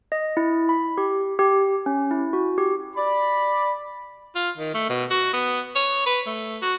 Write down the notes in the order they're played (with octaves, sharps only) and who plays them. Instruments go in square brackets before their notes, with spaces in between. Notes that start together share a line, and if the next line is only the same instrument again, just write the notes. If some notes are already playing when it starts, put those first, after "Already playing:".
[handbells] D#5
E4
B5
G4
G4
C#4
E4
F#4
G4
[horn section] D5 B5
[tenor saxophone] F4
D#3
A3
B2
F#4
B3
C#5
B4
A3
F#4